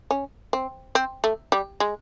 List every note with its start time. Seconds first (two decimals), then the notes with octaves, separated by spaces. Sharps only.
0.11 C#4
0.53 C4
0.95 C4
1.24 A3
1.52 G3
1.80 G#3